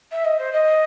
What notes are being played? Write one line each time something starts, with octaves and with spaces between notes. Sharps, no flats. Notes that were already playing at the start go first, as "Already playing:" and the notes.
E5
D#5
C5
D#5